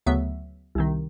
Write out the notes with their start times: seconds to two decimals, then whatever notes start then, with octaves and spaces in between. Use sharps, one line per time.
0.06 D2 C#3 F#3 B3 E5
0.75 C2 C3 D#3